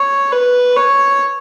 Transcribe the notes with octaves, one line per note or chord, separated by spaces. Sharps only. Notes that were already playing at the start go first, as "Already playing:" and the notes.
Already playing: C#5
B4
C#5